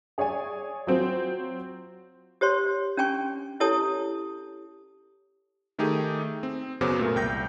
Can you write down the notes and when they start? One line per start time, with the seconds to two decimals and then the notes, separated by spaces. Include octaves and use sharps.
0.18 G#4 C#5 D5 G#5
0.87 F#3 C4 F4
2.41 G4 C5 C#5 C6
2.97 C#4 D4 G5 G#5 C#6
3.60 E4 G4 A4 C#5 A5 D#6
5.78 D#3 A3 D#4 G4 G#4
6.43 C4
6.81 F#2 C#3 F#3 B3 C5 D6
6.99 A#2 A3 A#4
7.16 C2 G5 G6 A#6